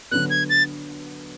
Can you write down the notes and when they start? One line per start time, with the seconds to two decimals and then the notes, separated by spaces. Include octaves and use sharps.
0.11 D3 F#3 B3 F#6
0.30 G#6
0.49 A6